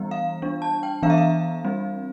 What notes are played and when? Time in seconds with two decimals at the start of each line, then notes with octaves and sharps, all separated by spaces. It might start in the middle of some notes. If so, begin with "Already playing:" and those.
Already playing: E3 G3 B3
0.11 F5
0.42 G3 D4
0.62 A5
0.83 G5
1.03 E3 B3 D4 F5
1.10 E5
1.18 F5
1.65 G3 C4